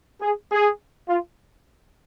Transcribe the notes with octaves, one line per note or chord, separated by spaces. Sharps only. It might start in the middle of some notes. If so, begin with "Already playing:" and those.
G#4
G#4
F4